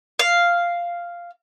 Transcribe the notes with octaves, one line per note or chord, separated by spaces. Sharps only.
F5